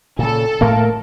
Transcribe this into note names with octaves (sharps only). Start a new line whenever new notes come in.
A#2 C#3 A4
A2 A3 A#3 A#4 F5 A5